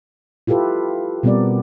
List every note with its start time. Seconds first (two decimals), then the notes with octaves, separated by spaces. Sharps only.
0.47 E4 F4 G4 A4 B4
1.23 B2 G3 B3 C4 A#4 D5